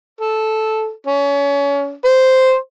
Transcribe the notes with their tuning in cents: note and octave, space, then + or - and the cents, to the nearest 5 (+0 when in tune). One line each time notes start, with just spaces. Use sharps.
A4 -10
C#4 +30
C5 -5